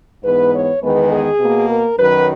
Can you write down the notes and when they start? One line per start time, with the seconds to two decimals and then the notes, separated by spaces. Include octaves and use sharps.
0.24 G#2 E3 B3 B4
0.54 C#5
0.82 E2 D#3 G#3 B3 B4
1.11 G#4
1.40 B2 A#3
1.69 A#4
1.98 F#2 D#3 F#3 B4